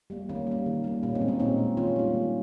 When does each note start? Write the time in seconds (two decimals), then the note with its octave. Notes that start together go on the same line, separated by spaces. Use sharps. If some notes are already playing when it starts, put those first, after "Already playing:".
0.10 G3 A#3
0.29 D#3 A#3 C#4
0.47 G3 A#3
0.66 D#3
0.84 G3 A#3
1.03 A#2 A#3 C#4
1.15 C4 D#4
1.22 G#3
1.28 A#3 C#4
1.40 A#2 C4 D#4
1.58 G#3
1.77 D#3 C#4 F4
1.96 G3 A#3
2.14 D#3